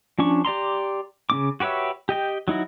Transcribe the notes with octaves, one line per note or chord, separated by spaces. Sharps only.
F3 C#4 D4 C#6
G4 D5 A#5 C6
C#3 C#4 D6
F#4 G4 B4 C#5 E5
G4 D#5 G5
F#3 D#4 E4 F#4